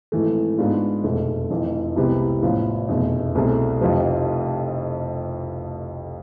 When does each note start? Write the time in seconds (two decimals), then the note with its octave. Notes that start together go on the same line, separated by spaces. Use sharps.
0.12 G#1 G#2 E3 A3
0.58 G#2 G#3 B3 D4 F4
1.04 F1 E2 B2 A3 C4
1.50 F1 F2 E3
1.96 C2 C3 G#3 B3 E4
2.42 A1 A2 F3 B3 F4
2.88 F1 E2 B2
3.35 C2 B2 A3 C4 G#4
3.81 F1 F2 C3 F3